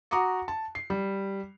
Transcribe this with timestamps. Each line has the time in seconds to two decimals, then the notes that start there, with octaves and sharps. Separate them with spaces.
0.11 F#4 A#5 D6 D#6 C#7
0.48 A5
0.75 C7
0.90 G3